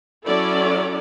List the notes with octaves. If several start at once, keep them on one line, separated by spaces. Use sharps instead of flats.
F#3 C#4 E4 A4 D5